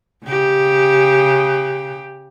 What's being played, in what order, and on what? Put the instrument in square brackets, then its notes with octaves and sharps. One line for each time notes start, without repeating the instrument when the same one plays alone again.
[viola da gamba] C#3 G4